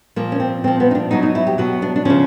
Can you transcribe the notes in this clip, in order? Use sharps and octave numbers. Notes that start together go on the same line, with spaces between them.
A#2 F3 A#3
C#4
C4
A#2 F3 C4
B3
D#4
D4
B2 F#3 D#4
D#4
E4
G4
B2 F#3 F#4
D4
D4
C#3 F3 C#4